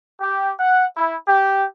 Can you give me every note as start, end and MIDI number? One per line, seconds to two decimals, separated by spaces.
0.19 0.50 67
0.60 0.85 78
0.96 1.15 64
1.27 1.64 67